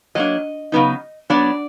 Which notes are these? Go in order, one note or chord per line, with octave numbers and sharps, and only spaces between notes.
F#3 A#3 D4 D#5
C#3 F#3 B3 D#4
F#3 B3 D4 D5